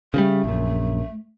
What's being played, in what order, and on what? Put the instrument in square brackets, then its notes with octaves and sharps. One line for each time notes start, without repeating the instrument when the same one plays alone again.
[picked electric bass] C#3 E3 G3 [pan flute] A3
[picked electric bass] A#1 F#2